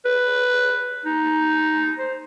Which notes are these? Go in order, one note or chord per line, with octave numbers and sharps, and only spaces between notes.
B4
D#4
C5